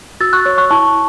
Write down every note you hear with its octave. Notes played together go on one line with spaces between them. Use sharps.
F#4 E6 A6
C#6 F#6
C#5
C#6 F#6
E4 A5 C#6